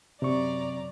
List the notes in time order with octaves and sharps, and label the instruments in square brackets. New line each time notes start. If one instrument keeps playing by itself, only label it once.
[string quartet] F#2 D5 A#5 [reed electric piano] C3 C#6